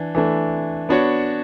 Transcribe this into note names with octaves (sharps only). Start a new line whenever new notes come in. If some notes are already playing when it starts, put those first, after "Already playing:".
Already playing: E3 D4
E3 A3 D4
B3 D4 F#4 C#5